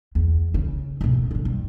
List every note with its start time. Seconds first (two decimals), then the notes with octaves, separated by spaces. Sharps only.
0.15 E2
0.54 C#3
1.01 D2 B2
1.31 D3 D4
1.45 G2